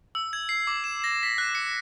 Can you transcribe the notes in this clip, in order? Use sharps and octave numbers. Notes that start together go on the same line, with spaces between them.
E6
G#6
C7
D6
E7
A#6
B6
F#6
C#7